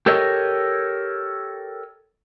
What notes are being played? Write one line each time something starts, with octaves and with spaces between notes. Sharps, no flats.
G4 A4 A#4 C#5 D#5